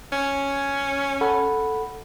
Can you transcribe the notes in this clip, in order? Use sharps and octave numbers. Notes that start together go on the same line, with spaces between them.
C#4
A4 F#5 B5